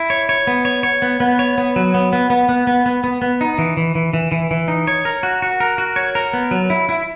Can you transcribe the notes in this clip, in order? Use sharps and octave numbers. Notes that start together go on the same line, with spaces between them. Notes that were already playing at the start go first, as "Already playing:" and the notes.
Already playing: E4
C#5
C#5
B3
C#5
C#5
B3
B3
C#5
B3
F#3
B3
B3
B3
B3
B3
B3
B3
B3
D#4
E3
E3
E3
E3
E3
E3
D#4
C#5
A#4
F#4
F#4
A#4
F#4
C#5
A#4
B3
F#3
E4
E4